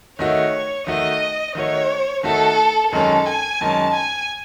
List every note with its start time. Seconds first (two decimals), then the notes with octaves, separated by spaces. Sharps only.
0.19 D#3 A3 D#4 F#4 C#5
0.87 D#3 A3 D#4 F#4 D#5
1.55 D#3 A3 D#4 F#4 C#5
2.23 D#3 A3 D#4 F#4 A4
2.92 F#2 D#3 G#3 C#4 A4
3.26 G#5
3.60 F#2 D#3 G#3 C#4 A5
3.94 G#5